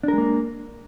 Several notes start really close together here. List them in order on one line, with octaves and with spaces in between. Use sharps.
D4 A#4 G#3 A#3